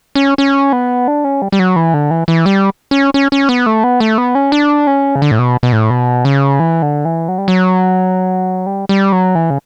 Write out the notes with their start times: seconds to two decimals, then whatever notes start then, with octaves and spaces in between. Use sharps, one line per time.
0.15 C#4
0.38 C#4
0.73 B3
1.08 D4
1.24 C#4
1.42 G3
1.52 G3
1.59 F#3
1.76 E3
1.94 D3
2.11 E3
2.28 E3
2.46 G3
2.91 C#4
3.14 C#4
3.32 C#4
3.49 B3
3.66 A3
3.84 B3
4.00 A3
4.18 B3
4.35 C#4
4.52 D4
4.87 C#4
5.16 C#3
5.22 D3
5.31 A2
5.39 B2
5.63 B2
5.73 A2
5.90 B2
6.25 C#3
6.60 E3
6.82 D3
7.05 E3
7.28 F#3
7.38 G3
7.48 F#3
8.66 G3
8.89 G3
9.12 F#3
9.35 E3
9.50 C#3